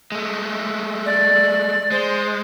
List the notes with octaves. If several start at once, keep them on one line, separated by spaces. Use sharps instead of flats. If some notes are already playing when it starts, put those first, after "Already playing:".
G#3 A3
D5
G#3 C5